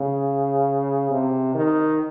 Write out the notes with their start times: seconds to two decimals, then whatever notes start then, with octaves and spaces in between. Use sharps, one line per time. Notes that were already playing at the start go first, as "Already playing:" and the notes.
Already playing: C#3
1.11 C3
1.55 D#3